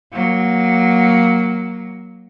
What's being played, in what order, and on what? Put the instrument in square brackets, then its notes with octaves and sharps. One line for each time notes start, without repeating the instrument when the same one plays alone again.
[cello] F#3 A#3